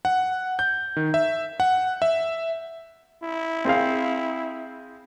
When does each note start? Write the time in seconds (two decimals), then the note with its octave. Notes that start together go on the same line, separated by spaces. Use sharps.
0.05 F#5
0.59 G6
0.97 D#3
1.14 E5
1.60 F#5
2.02 E5
3.23 E4
3.65 C4 G#4 F5